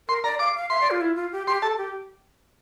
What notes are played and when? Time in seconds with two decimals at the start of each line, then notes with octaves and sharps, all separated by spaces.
0.08 A#4 C6
0.24 D5 A#5
0.39 F5 D6
0.55 F5
0.70 E5 C6
0.81 D5
0.91 F4
1.01 E4
1.16 F4
1.32 G4
1.47 G4 C6
1.62 A4 A5
1.78 G4